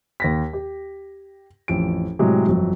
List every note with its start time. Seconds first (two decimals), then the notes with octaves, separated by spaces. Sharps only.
0.20 D#2 A#6 B6
0.53 G4
1.68 A1 F2 D7
2.19 A2 C3 F#3 G#3 G4
2.48 G1 F2 F#3